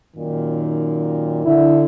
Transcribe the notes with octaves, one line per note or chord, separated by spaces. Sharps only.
F#2 A#2 D#3
D3 E4